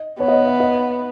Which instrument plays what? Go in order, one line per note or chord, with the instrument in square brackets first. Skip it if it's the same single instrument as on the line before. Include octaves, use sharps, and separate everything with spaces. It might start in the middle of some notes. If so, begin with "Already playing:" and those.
Already playing: [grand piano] D#5
[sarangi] B3 [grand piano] C#5
[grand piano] D#5
C#5
E5
D#5